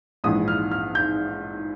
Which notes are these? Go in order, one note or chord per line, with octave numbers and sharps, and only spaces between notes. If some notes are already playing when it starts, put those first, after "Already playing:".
A#1 G#2 E3 D#6
F6
F6
G6